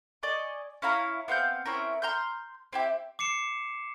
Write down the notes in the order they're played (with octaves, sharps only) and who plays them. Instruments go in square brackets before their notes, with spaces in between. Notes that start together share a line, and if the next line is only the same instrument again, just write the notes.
[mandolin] D5 D#5 G#5 C#6
C#4 E4 F5 A#5
B3 C4 F5 G6
C4 C#4 E4 A#4
A#5 C6 F6 G6
C4 E4 G4
[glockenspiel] D6 C7 C#7 E7